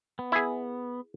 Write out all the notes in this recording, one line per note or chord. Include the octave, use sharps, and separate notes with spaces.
B3
E4 G#4